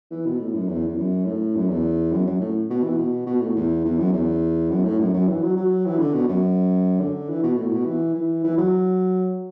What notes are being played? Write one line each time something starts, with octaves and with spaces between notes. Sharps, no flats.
E3
B2
A2
F#2
E2
E2
F#2
A2
F#2
E2
F#2
F#2
A2
B2
E3
B2
B2
A2
E2
E2
F#2
E2
F#2
A2
F#2
F#2
E3
F#3
F#3
E3
D3
B2
F#2
D3
E3
B2
A2
B2
E3
E3
E3
F#3